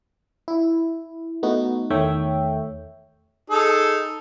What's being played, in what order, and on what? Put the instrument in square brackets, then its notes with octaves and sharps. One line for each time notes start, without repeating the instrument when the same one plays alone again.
[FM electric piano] E4
A3 B3 D#4 F#4
E2 D#3 A3 C#5 E5 G5
[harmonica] D#4 G#4 A4